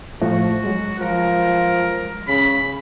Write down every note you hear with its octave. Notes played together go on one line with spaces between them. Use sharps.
A2 F3 A3 F#4
F#3 G#3
F3 A#4
C#3 B5